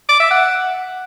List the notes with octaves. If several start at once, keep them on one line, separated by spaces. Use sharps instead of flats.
D6
E5
F#5